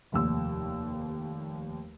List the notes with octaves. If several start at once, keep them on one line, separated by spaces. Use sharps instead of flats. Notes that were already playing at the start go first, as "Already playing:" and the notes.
F1 D#2 E6